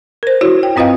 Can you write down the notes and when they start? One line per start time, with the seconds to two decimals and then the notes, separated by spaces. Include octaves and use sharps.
0.23 A#4 C5
0.41 E4 F#4 C#5
0.63 G5
0.76 G2 C4 F4 B4 D#5 F5